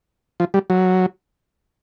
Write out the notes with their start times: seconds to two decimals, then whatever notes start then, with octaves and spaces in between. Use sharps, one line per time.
0.40 F3
0.54 G3
0.70 F#3